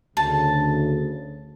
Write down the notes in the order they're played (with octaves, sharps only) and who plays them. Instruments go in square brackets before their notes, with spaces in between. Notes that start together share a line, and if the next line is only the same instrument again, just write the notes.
[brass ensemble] D2 C#3 [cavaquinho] A5